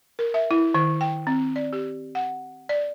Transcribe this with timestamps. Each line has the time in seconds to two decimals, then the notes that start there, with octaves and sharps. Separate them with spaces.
0.19 A#4
0.34 E5
0.51 E4
0.74 D#3
1.01 G5
1.27 C4
1.56 D5
1.73 G4
2.15 F#5
2.69 D5